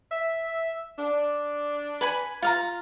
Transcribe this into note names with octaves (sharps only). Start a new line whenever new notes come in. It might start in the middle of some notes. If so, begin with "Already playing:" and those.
E5
D4
B4 G#5 B5
F4 F5 A#5